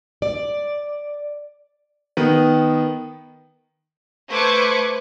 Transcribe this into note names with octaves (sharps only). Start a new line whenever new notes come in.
D5
D#3 B3
A3 B4 C5 D6 G#6 C#7